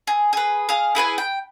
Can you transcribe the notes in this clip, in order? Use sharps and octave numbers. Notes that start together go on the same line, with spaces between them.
G#4
G#4 B4
G#4 F5
E4 G#4 B4 G#5
G5